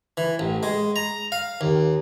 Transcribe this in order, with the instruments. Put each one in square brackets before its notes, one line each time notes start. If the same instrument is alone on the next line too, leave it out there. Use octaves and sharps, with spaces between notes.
[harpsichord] E3
A1
G#3
A#5
F5
D#2